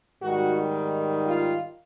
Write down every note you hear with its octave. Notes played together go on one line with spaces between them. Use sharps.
G#2 D#3 G3 F#4
F4